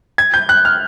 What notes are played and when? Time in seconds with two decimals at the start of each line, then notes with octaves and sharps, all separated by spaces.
0.18 G#6
0.34 G6
0.49 F#6
0.65 F6